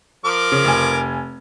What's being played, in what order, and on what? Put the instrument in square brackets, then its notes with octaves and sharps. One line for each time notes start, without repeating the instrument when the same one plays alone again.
[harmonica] F3 A#4 D6
[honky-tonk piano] C#3
F1 G#5